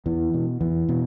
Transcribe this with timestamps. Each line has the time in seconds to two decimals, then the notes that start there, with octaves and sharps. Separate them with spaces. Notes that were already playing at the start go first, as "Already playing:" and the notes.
0.06 E2 E3
0.34 B2
0.61 E2 E3
0.89 B2